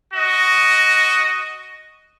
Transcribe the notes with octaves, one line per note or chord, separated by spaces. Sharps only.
F#4 D#5